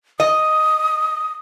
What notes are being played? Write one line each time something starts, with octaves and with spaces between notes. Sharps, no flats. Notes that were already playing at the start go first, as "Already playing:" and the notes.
D#5 D#6